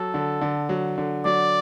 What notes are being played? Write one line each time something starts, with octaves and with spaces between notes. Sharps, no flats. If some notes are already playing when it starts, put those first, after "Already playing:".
Already playing: F#3 A4
D3
D3
F#3
D3
F#3 D5